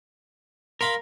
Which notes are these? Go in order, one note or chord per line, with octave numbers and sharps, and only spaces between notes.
A#4 F5 B5 C6